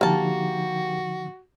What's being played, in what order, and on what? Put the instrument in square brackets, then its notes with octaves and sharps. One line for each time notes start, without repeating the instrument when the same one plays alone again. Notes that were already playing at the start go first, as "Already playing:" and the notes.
[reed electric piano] D3 F3 D#4 [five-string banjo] A#3 A5 [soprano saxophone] F#4 [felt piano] G4 G5